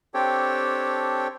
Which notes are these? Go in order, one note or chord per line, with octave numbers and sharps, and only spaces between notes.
C4 D4 G4 A4 C#5 G5